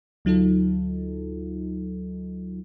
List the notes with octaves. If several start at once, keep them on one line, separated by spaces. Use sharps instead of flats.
D2 F#3 D#4 F4 A4